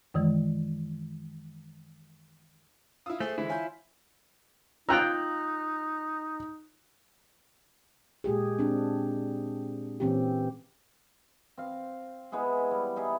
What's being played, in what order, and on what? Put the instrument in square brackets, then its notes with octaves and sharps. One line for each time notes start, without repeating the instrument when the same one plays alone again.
[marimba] F#2 D#3 E3 G#3
[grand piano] E4 F4 [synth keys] D#6 E6
[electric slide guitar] A3 [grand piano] G#4 [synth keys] C5
[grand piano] D3 E3 G#3 [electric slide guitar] E4
[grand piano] F4 G6 [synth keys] C#5 G#5 C6
[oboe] D#4 [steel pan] F4 G5 A#5 [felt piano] E6 F#6 G6
[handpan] A#2 G#3 G4 G#4
C4 D4
A#2 E3 C4 C#4 G4
[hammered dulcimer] C4 F5
G#3 B3 E4 G#4
G3
D#4 E4 G#4 E5